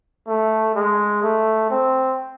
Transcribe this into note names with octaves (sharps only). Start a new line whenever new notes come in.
A3
G#3
A3
C4